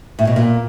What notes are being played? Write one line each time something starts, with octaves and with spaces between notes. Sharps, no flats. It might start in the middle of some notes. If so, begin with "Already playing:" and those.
A2
B2
A#2